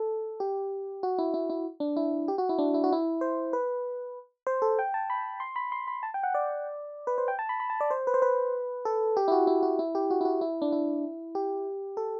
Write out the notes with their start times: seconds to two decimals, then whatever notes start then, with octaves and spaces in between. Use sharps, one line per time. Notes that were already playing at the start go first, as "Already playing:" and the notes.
Already playing: A4
0.40 G4
1.03 F#4
1.18 E4
1.34 E4
1.50 E4
1.80 D4
1.96 E4
2.28 G4
2.38 F#4
2.49 E4
2.58 D4
2.74 E4
2.84 F#4
2.92 E4
3.21 C5
3.53 B4
4.47 C5
4.62 A4
4.79 G5
4.94 A5
5.10 B5
5.40 C6
5.56 B5
5.72 C6
5.88 B5
6.03 A5
6.14 G5
6.23 F#5
6.34 D5
7.07 B4
7.18 C5
7.28 G5
7.39 A5
7.49 B5
7.60 B5
7.70 A5
7.81 D5
7.91 C5
8.07 B4
8.14 C5
8.22 B4
8.85 A4
9.17 G4
9.28 E4
9.32 F#4
9.47 E4
9.63 F#4
9.79 E4
9.95 G4
10.10 F#4
10.21 E4
10.25 F#4
10.41 E4
10.62 D4
10.72 E4
11.35 G4
11.97 A4